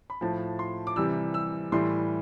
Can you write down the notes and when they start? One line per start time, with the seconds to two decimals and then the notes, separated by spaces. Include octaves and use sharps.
0.10 B5
0.21 A2 F3 A5
0.59 C6
0.87 D6
0.96 C3 E3 G3 E6
1.34 E6
1.72 A2 E3 G3 C6